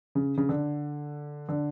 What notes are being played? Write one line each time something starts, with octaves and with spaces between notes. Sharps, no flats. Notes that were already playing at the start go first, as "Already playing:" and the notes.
C#3
C#3
D3
D3